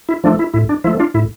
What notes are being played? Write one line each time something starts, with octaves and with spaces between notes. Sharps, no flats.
E4
F3 A3 D4
E4
A2 E4
D4
F3 A3 E4
D4 F4
A2 E4